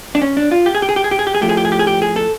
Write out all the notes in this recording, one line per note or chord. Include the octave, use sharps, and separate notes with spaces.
D4
C#4
D4
F4
G4
G#4
G4
G#4
G4
G#4
G4
G#4
G4
G#4
A2 F3 A3 G4
G#4
G4
G#4
G4
G#4
G4
G#4
A4